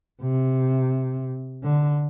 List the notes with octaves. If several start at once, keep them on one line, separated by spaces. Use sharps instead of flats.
C3
D3